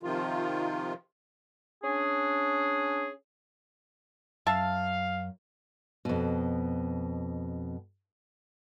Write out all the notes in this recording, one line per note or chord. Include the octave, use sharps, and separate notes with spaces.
C3 D#3 F3 F4
C#4 D4 G#4
F#2 E5 F5 A5
F2 B2